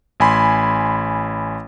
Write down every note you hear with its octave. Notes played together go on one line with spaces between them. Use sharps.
A1 G#5 B5 C6